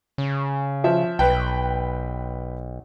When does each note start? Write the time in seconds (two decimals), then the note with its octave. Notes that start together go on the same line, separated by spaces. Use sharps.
0.18 C#3
0.84 F3 E5
1.19 B1 B4 G5